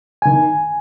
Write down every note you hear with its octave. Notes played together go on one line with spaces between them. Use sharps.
D#3 G#5